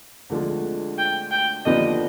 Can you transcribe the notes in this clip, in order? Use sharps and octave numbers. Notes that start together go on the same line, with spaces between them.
D2 D3 F3 G#3
G5
G5
D#2 D3 F3 B3 D4 D#5